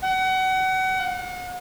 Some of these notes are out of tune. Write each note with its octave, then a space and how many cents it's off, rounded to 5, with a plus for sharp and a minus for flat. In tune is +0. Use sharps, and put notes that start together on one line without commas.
F#5 +30
F#5 -40